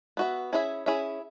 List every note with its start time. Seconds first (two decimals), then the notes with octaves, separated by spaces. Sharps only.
0.17 B3 F#4 E5
0.53 C#4 E4 G#4 E5
0.86 C#4 E4 G#4 E5